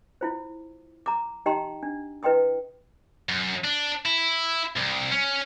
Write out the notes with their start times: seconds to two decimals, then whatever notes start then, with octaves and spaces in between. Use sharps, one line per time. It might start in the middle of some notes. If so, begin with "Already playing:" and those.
0.21 E4 F4 C5
1.06 A#5 D6
1.46 D#4 G4 D#5 G5 A#5 C6
1.83 D4
2.23 E4 B4 D#5 G5 C6 D#6
3.29 F#2
3.64 D4
4.05 E4
4.77 C2
5.12 C#4